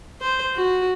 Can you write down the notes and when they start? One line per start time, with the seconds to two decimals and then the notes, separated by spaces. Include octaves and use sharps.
0.21 C5
0.55 F#4